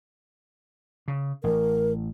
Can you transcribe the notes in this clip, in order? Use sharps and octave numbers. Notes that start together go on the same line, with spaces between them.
C#3
A1 A#4